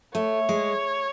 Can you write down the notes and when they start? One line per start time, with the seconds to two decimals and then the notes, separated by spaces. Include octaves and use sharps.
0.15 A3 C#5
0.49 G#3